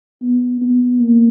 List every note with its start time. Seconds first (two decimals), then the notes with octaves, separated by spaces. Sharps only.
0.22 B3
0.61 B3
1.00 A#3